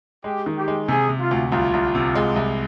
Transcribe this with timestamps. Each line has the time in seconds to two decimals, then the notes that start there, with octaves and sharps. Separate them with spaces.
0.24 G#3 G4
0.46 D#3
0.56 G4
0.68 G#3
0.88 C3 G#4
1.09 C3
1.20 F4
1.31 D2
1.52 C2 F4
1.73 C2
1.95 C3
2.15 G#3
2.36 C2